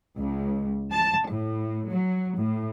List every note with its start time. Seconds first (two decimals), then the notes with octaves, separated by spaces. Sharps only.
0.18 C#2
0.92 A5
1.27 A2
1.88 F#3
2.38 A2